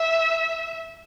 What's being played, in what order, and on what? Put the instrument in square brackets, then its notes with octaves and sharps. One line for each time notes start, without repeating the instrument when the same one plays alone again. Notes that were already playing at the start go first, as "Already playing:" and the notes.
Already playing: [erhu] E5